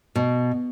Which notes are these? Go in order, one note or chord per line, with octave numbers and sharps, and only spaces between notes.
B2